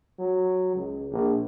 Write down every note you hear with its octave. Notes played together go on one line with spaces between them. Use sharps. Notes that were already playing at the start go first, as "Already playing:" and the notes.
F#3
C#2
A#1